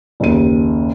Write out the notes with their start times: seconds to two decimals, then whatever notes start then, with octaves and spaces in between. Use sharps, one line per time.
0.20 F#1 D#2 D#7